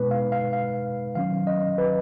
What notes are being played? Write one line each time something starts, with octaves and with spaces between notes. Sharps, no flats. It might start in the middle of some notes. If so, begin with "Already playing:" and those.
Already playing: B2 G#3 B3 D#4 B4
F5
F5
F5
D#3 F#3 C#4 F5
D#5
B4